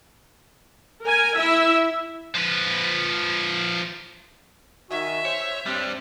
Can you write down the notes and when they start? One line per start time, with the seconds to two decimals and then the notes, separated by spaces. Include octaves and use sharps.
1.03 A#4 G#5
1.37 E4 E5
2.36 F3 B4
4.91 D#3 F#4 E5 G#5
5.25 C5 C#5
5.66 G3 C4 D4